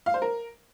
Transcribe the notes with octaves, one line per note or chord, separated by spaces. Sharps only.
F5
C5
A#4